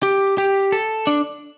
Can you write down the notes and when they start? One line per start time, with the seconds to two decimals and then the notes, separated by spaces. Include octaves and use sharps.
0.03 G4
0.38 G4
0.72 A4
1.07 D4